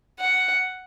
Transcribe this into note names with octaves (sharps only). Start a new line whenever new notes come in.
F#5